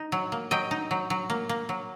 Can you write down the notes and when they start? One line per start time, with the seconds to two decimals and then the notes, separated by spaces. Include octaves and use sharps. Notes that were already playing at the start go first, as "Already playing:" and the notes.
Already playing: D#4
0.12 F#3
0.32 A#3
0.51 F#3 D#5 G5
0.71 D#4
0.91 F#3
1.10 F#3
1.30 A#3
1.49 A#3
1.69 F#3